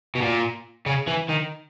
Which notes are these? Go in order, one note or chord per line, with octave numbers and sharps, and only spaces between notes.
B2
A#2
C#3
E3
D#3